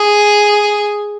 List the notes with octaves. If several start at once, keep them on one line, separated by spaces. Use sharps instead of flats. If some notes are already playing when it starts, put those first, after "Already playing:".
Already playing: G#4